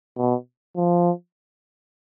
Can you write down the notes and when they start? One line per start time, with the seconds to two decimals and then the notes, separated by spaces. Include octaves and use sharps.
0.17 B2
0.76 F3